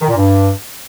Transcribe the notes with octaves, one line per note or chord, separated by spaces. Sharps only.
D#3
A#2
G2